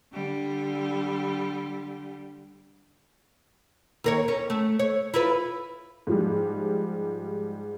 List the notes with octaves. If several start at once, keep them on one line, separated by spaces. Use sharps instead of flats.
D3 G3
D#2 A#4 C#5
C#4
A3
C#5
E4 F4 B4
G#2 F3 G3